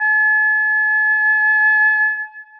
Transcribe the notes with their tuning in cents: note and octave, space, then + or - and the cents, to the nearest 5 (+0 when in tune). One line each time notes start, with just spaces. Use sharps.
A5 -45